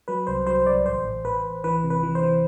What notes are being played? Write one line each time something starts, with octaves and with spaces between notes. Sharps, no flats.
F#3 B4
C2 C5
F#3 C5
C2 D5
A1 C5
A1
A1 B4
A1
E3 B4
C3
B4
E3
C5
E3